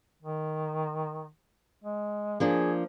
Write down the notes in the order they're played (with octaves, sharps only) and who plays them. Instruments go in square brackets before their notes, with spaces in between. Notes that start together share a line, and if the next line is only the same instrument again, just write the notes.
[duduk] D#3
G#3
[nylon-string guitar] F3 A#3 D4 [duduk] G#4